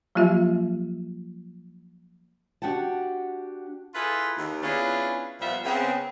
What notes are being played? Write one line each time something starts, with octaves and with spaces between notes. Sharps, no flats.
F3 F#3 A#3 F4 G4 E5
D4 F#4 G4 F#5 G5 A5
E4 F4 G#4 A4 B4
D#2
B3 C#4 D4 E4 F4 G#4
A#2 F3 G3 B3 E5 F5
C#3 B3 C4